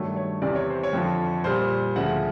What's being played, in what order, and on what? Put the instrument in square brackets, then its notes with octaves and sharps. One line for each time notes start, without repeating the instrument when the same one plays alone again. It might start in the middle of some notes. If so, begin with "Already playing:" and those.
Already playing: [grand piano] G2 D#3 F#3 A3 C#5
C#5
E2 C3 E3 D5
C#5
C5
C#5
F2 D3 F3
A#2 G3 C5
D2 C#3 F3 F#5